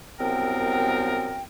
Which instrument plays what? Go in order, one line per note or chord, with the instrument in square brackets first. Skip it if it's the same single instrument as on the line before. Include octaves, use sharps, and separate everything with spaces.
[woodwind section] C2 F#2 B3 C4 A#4 G5